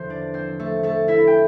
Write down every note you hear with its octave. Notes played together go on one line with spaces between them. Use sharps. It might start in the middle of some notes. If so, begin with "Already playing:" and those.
Already playing: E2 D3 F3 C5 C6
D4 D5
C4 C5
A3 A4
A3 A4
E4 E5
G5